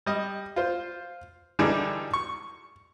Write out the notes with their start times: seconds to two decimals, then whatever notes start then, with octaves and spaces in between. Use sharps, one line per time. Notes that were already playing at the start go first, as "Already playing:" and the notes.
0.06 G3 D#5
0.56 F4 C5
1.59 D3 E3 G3 D4 D#4 G#4
2.14 C#6